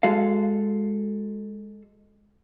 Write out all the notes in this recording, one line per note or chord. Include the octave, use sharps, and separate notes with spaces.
G#3 F#4 A4 F5